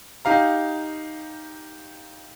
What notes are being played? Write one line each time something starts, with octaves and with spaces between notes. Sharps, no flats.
D#4 G4 F5 A#5